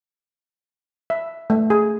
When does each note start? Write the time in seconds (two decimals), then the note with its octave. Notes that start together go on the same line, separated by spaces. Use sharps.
1.10 E5
1.50 A3
1.70 G#4